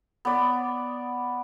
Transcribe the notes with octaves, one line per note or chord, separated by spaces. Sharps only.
B3 D5